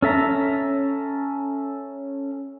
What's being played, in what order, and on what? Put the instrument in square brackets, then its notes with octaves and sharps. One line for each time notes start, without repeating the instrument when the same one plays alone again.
[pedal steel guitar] C#4 A4 E5 A#5